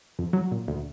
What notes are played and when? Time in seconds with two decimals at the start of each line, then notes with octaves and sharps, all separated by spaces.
0.19 F2
0.33 F#3
0.52 A#2
0.68 D2